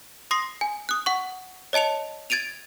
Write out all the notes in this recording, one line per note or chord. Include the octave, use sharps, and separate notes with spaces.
C6 D#6 A#6 C7
G#5
D#6 F#6
F#5 C#6
C#5 D#5 A5 C#7 F7
G#6 A6 D7 D#7 F7